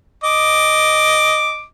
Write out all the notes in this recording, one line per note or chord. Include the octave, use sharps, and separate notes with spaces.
D#5 D6